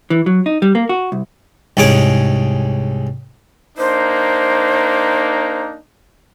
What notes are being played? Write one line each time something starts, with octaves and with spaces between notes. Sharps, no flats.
E3
F#3
D#4
G3
A#3
F#4
C2
C2 G#2 C#4 G#4 D6
A#3 D4 D#4 C5